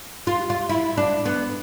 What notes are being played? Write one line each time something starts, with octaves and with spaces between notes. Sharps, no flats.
F4
F4
E4
D4
B3